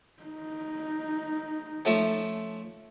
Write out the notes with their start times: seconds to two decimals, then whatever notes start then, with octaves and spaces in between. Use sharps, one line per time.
0.23 D#4
1.85 F3 A3 C#4